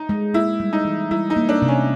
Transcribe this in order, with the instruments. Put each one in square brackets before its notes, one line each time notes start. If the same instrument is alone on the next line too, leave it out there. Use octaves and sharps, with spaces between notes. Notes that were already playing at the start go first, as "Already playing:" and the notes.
Already playing: [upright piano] D#4
[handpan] G#3
[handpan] A#3 [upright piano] E4
[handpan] G3
[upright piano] D#4
[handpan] E3
[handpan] G3 [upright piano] E4
[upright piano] D#4
[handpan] A#3
[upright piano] D4
[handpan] C3
[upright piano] C#4